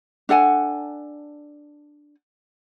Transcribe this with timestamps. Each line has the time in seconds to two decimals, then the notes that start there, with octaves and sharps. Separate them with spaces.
0.29 D4 A4 F#5 G#5